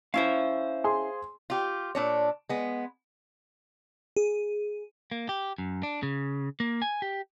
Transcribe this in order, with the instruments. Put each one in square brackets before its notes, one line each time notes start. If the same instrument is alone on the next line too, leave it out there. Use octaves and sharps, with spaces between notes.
[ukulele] C#4 E4 E5 [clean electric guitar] C5 F5
[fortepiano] G#4 C6
[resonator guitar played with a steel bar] F4 G4
A#2 D4 C#5
G#3 B3
[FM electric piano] G#4
[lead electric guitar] A#3
G4
F#2
D4
C#3
A#3
G#5
G4